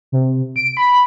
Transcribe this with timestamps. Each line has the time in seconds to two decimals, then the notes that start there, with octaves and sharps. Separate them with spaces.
0.12 C3
0.56 D7
0.77 B5